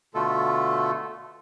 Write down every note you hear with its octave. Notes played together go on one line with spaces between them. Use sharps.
B2 D3 A3 F4 A4